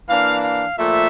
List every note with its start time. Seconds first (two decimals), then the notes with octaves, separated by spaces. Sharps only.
0.09 E3 A#3 D4 F5
0.44 F5
0.79 A#2 F3 A3 E5